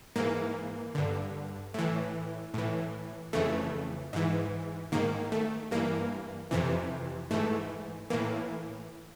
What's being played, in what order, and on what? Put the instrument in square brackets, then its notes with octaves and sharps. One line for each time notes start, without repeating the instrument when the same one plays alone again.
[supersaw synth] G#2 E3 A#3
G2 D3
A2 E3
A2 E3
F2 C#3 E3 A3
G#2 E3
G#2 D#3 A#3
A3
G2 E3 A#3
F2 C3 E3
G#2 E3 A3
A2 E3 A#3